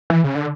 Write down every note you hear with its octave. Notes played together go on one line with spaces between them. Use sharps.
E3
C#3
D3